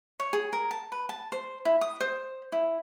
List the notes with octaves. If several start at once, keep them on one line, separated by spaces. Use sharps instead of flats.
C#5
G#4
A#4
A5
B4
A5
C5
E4
D#6
C5
E4